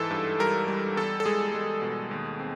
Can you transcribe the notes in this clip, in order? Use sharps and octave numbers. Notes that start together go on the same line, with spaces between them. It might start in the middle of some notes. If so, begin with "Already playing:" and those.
Already playing: G#2 E3 A4
G2
G3 A#4
G3
E2 A4
A4
G#3 G#4
G#3
B2
D#2
C4